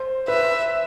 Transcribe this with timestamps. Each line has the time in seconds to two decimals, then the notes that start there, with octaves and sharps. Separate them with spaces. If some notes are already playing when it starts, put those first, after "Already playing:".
Already playing: C5
0.28 B4 E5